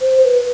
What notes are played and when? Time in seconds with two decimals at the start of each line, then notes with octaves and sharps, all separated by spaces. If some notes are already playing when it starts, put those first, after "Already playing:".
0.01 C5
0.24 B4